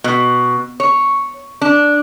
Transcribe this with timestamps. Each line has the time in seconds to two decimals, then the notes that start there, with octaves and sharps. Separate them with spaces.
0.04 B2
0.80 C#5
1.61 D4